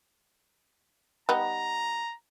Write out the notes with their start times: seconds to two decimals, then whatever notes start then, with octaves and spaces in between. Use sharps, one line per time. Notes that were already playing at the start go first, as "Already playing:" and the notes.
1.29 G3 B3 D#4 A#5